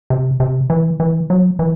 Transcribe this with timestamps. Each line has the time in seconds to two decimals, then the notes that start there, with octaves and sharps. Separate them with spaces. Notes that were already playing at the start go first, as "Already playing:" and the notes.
0.10 C3
0.40 C3
0.70 E3
1.00 E3
1.30 F#3
1.59 E3